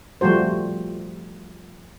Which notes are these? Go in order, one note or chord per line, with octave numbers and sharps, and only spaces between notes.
F3 G3 A3 F#4 C5